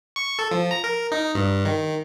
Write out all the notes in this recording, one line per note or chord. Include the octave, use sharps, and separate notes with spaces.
C#6
A4
F3
A#5
A#4
D#4
G2
D#3